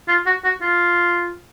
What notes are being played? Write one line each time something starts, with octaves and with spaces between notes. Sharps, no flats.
F4
F#4
F#4
F4